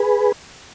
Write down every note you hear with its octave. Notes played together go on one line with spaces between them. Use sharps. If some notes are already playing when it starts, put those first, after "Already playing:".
Already playing: G#4 B4